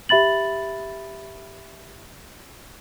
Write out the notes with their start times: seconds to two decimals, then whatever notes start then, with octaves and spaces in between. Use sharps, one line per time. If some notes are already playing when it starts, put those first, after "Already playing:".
0.09 G4 E5 B5 A6 F#7